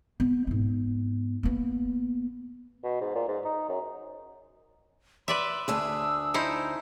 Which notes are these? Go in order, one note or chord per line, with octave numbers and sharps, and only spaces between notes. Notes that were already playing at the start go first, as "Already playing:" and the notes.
B3
G#2 B3
A#3 B3
B2
G#2
A#2
G#2
D#4
F#2
B4 D5 E5 C6
D2 D4 G#4 E6
D#4 E4 C5